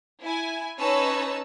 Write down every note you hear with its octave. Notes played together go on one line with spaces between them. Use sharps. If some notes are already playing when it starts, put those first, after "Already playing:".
E4 G#5
C#4 D#4 B4 C#5 A5 E6